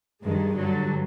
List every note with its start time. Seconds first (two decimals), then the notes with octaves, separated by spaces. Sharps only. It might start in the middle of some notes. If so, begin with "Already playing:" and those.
0.23 G2 D#3 G#3
0.55 G2 D3 F#3